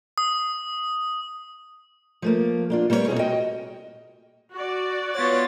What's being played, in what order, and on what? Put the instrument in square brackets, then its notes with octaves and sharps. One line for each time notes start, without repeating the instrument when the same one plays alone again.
[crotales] D#6
[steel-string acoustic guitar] F3 A3 A#3
A#3 D4 F4
G3 A#3 B3 E4 C#5
B2 C4 F4 G#4
F#4 D#5 G5
[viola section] F#4 D5
[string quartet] B3 F4 A6 [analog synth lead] C#5